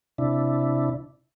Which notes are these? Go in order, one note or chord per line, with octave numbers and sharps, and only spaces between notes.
C3 D4 E4